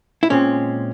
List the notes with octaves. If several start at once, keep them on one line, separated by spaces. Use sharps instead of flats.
E4
A#2 G#3 C4 C#4